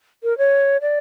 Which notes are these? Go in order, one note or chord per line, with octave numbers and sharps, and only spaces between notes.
A#4
C#5
D5